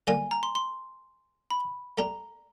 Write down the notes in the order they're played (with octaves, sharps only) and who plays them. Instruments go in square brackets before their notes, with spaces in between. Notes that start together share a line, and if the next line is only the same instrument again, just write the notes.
[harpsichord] D3 G3 A#3 D4 F4 [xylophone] G#5
[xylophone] A#5
C6
C6
B5
[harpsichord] A3 D4 G4 [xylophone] A#5